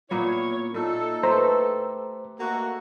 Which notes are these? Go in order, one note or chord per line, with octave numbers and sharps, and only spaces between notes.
A#2 A#3 B3 E4 C#5
A#2 D#4 E4 A4
A3 G4 B4 C5 A#5
A#3 F#4 A4 D#5 E5